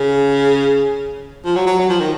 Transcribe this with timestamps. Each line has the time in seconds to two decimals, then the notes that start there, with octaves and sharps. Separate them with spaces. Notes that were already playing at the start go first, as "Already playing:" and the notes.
Already playing: C#3
1.45 F3
1.56 F#3
1.67 F#3
1.79 F#3
1.89 F3
2.01 D#3